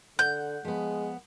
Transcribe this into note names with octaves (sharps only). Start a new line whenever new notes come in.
D3 F#5 G6
F3 G#3 B3